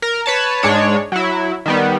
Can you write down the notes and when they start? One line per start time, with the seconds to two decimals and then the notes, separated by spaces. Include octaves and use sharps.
0.02 A#4
0.26 B4 C#5 A5
0.63 G#2 G#3 D4 C#5
1.12 F#3 E4
1.66 D#3 G3 B3